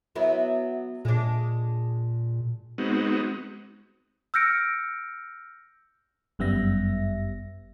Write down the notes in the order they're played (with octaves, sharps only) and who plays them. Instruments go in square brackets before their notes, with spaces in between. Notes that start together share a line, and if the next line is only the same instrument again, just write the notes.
[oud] F#3 B3 E4
[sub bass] A#2 [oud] G#3 D4
[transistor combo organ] G#3 B3 C4 D#4 F#4
[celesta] E6 F6 G6 A#6 C#7 D7
[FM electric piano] G1 F#2 G3 B3 E5 A#6